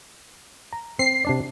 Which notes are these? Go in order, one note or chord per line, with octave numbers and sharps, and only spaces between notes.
A#5
C4 C7
C3 D4 D5